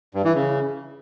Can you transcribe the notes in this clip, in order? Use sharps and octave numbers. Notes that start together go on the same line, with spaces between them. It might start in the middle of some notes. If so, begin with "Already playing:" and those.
G2
E3
C#3